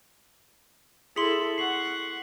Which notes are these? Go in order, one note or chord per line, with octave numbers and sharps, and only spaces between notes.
E4 G#4 A4 C6 B6 C#7 F#7
F#5 C#6 C7 F#7